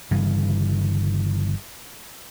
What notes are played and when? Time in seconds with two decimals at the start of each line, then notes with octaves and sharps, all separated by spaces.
0.11 G1 G2 C#3 E3